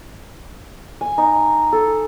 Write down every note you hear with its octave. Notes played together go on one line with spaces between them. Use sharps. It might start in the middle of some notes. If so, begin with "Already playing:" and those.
G#5
D#4
A4